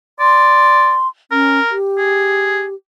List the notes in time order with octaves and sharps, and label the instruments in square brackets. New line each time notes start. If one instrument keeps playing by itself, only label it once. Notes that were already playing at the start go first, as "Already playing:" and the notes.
[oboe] D5 [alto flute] C6
[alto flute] C#4 [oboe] A#4
[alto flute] G4
[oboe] G#4